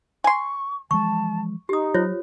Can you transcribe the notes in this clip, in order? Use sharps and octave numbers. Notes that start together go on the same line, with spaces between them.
G#5 C6 C#6
E3 F3 G#3 A5 C#6
D#4 G4 D#6
F#3 F4 C5 C#5